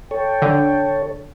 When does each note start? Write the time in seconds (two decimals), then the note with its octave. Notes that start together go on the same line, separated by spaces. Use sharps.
0.11 A4 C#5 G5
0.42 D3